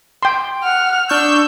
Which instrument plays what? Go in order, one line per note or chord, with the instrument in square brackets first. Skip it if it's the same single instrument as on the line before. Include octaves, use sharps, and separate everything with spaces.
[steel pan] G5 C6
[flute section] F#5 F#6 [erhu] F6
[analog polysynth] D4 C#6 G6 [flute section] D#6 [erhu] E6